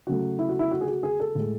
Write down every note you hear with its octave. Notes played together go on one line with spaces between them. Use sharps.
C#3 F#3 A3 F#4
E4
F#4
E4
F#4
G#4
F#4
G#4
A4
A2 G#3